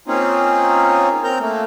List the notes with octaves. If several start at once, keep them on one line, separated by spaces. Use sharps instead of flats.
A#3 C4 C#4 D#4 F4 G#4
C4 A#4 A#5 G6
A3 A#3